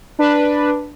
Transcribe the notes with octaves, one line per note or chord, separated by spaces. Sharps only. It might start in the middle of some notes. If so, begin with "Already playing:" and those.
D4 B4